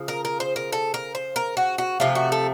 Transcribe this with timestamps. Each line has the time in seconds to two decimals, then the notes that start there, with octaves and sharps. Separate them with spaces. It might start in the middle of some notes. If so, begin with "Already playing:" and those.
Already playing: C#3 F3
0.08 A#4
0.25 A#4
0.40 C5
0.56 A#4
0.72 A4
0.94 A#4
1.15 C5
1.36 A#4
1.57 F#4
1.78 F#4
2.00 C3 F3 A3 F4
2.15 F#4
2.32 A4